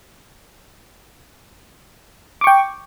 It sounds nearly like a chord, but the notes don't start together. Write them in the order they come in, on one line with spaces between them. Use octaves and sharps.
D6 C#6 G5